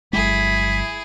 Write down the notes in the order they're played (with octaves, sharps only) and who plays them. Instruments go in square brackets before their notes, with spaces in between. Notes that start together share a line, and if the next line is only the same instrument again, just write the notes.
[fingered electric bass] G1 F#3 G#3 [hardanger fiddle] E4 G#4 [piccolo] B6